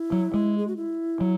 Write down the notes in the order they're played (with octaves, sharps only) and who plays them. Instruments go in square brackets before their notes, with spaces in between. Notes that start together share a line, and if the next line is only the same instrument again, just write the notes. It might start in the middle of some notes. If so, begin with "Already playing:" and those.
Already playing: [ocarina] E4
[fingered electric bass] F#3
G#3
[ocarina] G#4
F#4
E4
[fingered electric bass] F#3